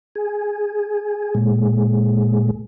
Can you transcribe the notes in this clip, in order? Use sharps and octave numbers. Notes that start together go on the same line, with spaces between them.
G#4
A#2 G#3